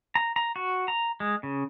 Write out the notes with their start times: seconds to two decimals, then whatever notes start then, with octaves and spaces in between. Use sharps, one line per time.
0.15 A#5
0.36 A#5
0.56 F#4
0.88 A#5
1.20 G#3
1.43 C#3